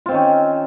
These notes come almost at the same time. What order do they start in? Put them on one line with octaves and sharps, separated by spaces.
F4 C4 D#3 C#4